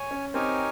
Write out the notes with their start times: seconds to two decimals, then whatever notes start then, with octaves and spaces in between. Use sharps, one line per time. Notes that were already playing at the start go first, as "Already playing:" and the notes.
Already playing: C#5 G#5
0.11 C#4
0.34 C4 D#4 G4 A#4 C#5 G#5